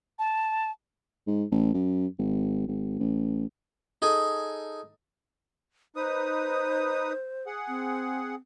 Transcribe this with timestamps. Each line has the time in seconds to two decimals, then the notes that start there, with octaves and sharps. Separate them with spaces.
0.19 A5
1.27 G#2
1.51 A1
1.74 F#2
2.19 G#1
2.68 G#1
2.99 A1
4.02 D#4 G#4 A4 G#5
5.96 D#4 B4 C5 D#6
7.47 G#4 F#5
7.68 C4